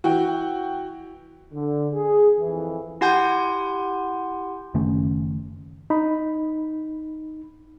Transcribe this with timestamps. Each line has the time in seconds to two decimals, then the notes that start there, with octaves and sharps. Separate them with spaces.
0.04 E3 F#4 G5
1.53 D3
1.93 G#4
2.39 F2 E3
3.01 E4 G4 F#5 G#5 C6 G6
4.74 F#1 D#3 A3 C#4
5.90 D#4 B5